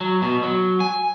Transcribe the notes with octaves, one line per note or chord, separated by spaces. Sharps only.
F#3
B2
F#3
G#5